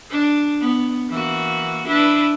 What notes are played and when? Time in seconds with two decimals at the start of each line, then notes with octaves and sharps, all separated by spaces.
0.10 D4
0.60 B3
1.10 E3 A#3 F#4
1.87 D4 E4 B4